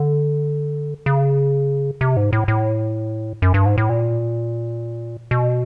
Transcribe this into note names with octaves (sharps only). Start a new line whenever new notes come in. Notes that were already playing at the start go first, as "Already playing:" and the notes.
Already playing: D3
C#3
C3
G#2
A2
A2
F#2
G2
G#2
A2
A#2
B2